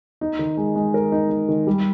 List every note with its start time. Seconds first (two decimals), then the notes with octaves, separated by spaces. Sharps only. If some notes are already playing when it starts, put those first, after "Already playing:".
0.21 D#4
0.39 D#3
0.57 G#3
0.76 G#3
0.94 A#4
1.12 D#4
1.30 D#4
1.49 D#3
1.67 G3